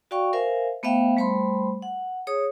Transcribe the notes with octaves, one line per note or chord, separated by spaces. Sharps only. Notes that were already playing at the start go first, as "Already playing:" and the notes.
F#4 D5 F5 G5 C#6
A#4 C5 E5 F5 G#5
A3 B3 C5 E5 F5 G5
G3 A3 C5 B5 C6
F#5
G#4 C#5 D#6